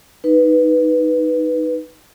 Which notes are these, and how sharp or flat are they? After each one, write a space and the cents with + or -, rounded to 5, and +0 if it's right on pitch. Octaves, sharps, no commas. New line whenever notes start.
D#4 +0 B4 +0